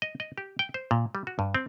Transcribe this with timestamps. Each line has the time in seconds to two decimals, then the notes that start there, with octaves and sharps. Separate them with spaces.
0.02 D#5
0.20 D#5
0.38 G4
0.59 G5
0.74 C5
0.91 A#2
1.15 G3
1.27 F#4
1.39 G2
1.55 C4